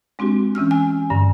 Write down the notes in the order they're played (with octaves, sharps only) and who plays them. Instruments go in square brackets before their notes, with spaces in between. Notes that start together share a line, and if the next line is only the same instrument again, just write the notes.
[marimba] G#3 C4 D4 F#4 G4
E3 C#4 E6 F6
G#5
G2 D3